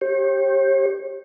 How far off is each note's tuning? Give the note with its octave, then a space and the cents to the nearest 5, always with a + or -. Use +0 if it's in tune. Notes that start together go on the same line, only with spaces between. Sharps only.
G4 +0 C#5 -45